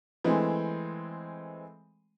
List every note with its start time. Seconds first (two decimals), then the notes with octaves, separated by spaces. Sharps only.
0.24 E3 G#3 A3 C4